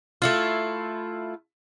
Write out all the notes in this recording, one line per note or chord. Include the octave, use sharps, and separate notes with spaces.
A3 E4 F4